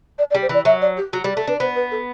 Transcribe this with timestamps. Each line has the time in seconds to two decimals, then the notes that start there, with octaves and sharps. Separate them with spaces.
0.19 D5
0.31 D5
0.35 G3
0.42 C5
0.49 E3 D5
0.65 F#3 E5
0.81 D5
0.97 G4
1.13 F#3 F#4
1.24 G3 G4
1.36 A3 A4
1.47 D4 B4
1.60 B3 C5
1.76 B4
1.91 A4